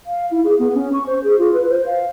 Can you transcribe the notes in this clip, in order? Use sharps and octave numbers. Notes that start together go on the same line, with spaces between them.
F5
E4
G#4
B3
C#4
C#6
C5
G#4
F4
B4
C5
F5